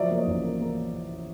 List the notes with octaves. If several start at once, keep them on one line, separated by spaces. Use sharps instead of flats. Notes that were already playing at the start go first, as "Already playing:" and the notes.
Already playing: F3 F#3 D5 E5
A#3
C#5 D#5
A1
A#3
A#3